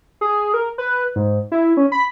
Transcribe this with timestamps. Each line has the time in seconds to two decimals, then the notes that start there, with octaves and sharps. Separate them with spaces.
0.21 G#4
0.54 A#4
0.78 B4
1.16 G#2
1.52 E4
1.77 C#4
1.92 B5